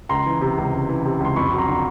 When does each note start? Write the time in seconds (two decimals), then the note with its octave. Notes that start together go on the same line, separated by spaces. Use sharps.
0.09 C#2 A#5 C6
0.26 E3
0.41 C3
0.58 C#2
0.73 C#2
0.89 E3
1.06 C3
1.20 C#2 C6
1.36 F2 B5 C#6
1.53 F#3
1.58 A#5 C6
1.69 D3